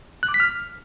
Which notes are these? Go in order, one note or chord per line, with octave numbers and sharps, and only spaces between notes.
F#6
D6
B6
F6